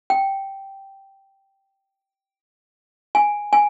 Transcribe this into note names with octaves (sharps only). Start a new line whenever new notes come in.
G5
G#5
G#5